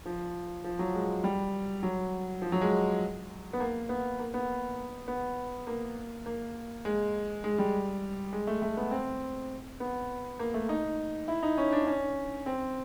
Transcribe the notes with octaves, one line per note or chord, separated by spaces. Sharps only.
F3
F3
F#3
G#3
G3
F#3
F3
F#3
G#3
B3
A#3
B3
A#3
B3
B3
A#3
A#3
G#3
G#3
G3
G#3
A3
A3
B3
C4
B3
A#3
A3
D#4
E4
D#4
C#4
D4
C#4
C4